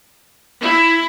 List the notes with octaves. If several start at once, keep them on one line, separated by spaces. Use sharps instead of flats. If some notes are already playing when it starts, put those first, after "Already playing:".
E4